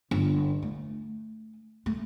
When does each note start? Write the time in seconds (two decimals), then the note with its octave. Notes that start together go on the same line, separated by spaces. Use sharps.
0.11 G1
0.62 A3
1.86 A3